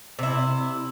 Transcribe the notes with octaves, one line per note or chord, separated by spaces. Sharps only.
C3 E4